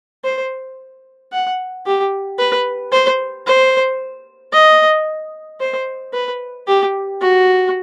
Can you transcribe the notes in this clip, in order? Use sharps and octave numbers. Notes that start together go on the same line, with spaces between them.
C5
F#5
G4
B4
C5
C5
D#5
C5
B4
G4
F#4